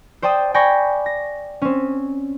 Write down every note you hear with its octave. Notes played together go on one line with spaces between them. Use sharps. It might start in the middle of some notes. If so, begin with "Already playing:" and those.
C5 D5 G5 A5 D#6
D5 G5 G#5 B5 C#6 A#6
A#6
C4 C#4